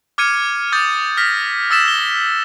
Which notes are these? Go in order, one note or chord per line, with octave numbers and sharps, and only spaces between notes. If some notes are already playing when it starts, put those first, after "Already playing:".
D6 F6 G#6 C#7 D#7
D6 D#6 F6 G6 A6
F6 A#6 B6
D#6 E6 A6 B6 E7
G7